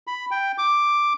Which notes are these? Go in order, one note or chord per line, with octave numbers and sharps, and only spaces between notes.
B5
G5
D6